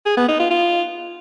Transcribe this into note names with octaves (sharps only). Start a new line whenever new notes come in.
G#4
B3
D#4
F4
F4